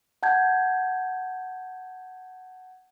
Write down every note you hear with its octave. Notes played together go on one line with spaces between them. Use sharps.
F#5 A5 G6 G#6